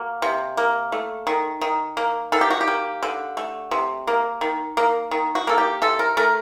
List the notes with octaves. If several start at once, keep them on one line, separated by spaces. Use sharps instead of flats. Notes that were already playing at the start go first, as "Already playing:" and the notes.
Already playing: A#3 F#4
C3
A#3
A3
D#3
D#3
A#3
D#3 A4
G4
F#4
G4
A#3
D3
A3
C3
A#3
D#3
A#3
D#3
F#4
A#3 A4
G4
C3 A4
A#4
A3 A#4